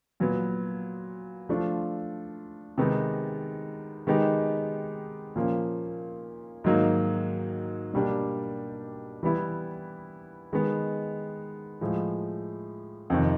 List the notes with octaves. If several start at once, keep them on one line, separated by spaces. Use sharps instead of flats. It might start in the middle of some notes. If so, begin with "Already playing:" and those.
A#2 F#3 B3
F3 A3 D4 F4
C3 D#3 G#3 B3 D#4
D#3 G#3 B3 D#4 G4
A#2 F3 A#3 C#4
G#2 D#3 F#3 A#3 D#4
B2 G3 A#3 D4 G4
E3 G3 B3 E4
D#3 G#3 B3
A2 F3 G#3
F2 C3 D#3